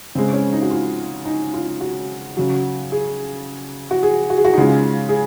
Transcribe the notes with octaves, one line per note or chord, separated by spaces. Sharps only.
C#3 G#3 C4
C#4
D#4
F#4
F4
D#4
F4
F#4
C#3 F#3
G#4
F#4
G#4
F#4
G#4
F#4
D#4
C#3 G#3 F4
G#4